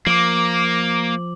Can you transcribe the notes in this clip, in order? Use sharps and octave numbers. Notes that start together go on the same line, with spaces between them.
F3 A#3 D6 F#7